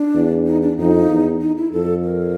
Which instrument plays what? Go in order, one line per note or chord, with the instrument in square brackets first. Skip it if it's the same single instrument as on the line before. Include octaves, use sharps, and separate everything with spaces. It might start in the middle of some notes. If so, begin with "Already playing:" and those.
Already playing: [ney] D4
[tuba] E2
[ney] D#4
D4
[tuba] F2 [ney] D#4
[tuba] E2
[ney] D#4
E4
[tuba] F2 [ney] A4
[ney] A#4